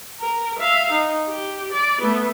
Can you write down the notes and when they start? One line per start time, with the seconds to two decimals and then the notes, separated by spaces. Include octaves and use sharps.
0.20 A#4
0.59 E5 F5
0.91 D#4
1.30 G4
1.72 D5
2.01 A3 B3